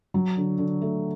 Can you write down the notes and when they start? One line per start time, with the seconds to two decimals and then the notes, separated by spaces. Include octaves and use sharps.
0.14 F#3
0.37 D3
0.58 D3
0.82 A3